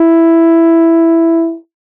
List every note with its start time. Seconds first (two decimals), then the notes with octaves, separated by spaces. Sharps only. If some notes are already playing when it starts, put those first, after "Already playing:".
Already playing: E4